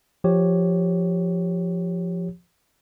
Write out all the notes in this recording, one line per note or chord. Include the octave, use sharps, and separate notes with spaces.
F3 G4 C#5